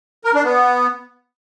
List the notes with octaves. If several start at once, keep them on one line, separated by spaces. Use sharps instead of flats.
A#4
D4
B3